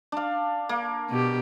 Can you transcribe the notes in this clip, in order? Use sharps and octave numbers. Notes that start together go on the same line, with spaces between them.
D4 F5
A#3
B2 G4